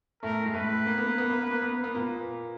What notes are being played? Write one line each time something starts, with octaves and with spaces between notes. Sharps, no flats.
A2 A3 A#4
G#3
A2 A3 B4
A#3
B3
A#3
B3
A#3
B3
A#3
B3
A#3
B3
A#2 A#3